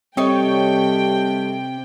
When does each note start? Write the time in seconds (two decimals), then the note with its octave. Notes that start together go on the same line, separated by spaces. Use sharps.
0.17 C3 G3 A3 C4 D#4 C#5 G5